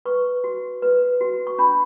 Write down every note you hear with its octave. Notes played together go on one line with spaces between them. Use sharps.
B4 C#6
F#4
B4
F#4
C#6
D4 B5